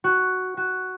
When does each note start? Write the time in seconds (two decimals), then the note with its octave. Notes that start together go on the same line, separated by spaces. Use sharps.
0.04 F#4
0.57 F#4